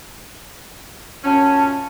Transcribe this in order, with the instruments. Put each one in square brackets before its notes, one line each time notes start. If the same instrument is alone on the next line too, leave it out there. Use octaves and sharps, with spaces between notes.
[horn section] F#2 A#2 C#4 [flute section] F#5 A5